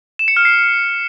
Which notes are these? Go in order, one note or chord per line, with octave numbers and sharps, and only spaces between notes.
E7
C#7
F6
C7